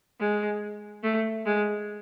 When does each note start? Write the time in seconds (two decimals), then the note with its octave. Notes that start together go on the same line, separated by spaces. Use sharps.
0.20 G#3
1.04 A3
1.46 G#3